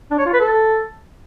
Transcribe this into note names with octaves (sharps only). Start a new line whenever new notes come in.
D4
C#5
F4
B4
A4